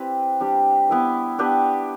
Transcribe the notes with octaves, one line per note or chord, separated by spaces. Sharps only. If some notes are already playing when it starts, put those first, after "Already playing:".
Already playing: C4 E4 G4 B4 D5
G3 D4 G4
B3 E4 B4
B3 D4 G4 B4